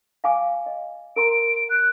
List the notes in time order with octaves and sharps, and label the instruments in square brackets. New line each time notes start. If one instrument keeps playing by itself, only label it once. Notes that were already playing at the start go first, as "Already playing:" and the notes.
[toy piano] F5 G#5 D6
D#5
[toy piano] A#4 A#5 C6 [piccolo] D7
[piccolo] F#6